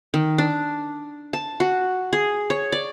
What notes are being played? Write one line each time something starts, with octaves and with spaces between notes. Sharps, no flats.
D#3
D4
A5
F#4
G#4
C#5
D5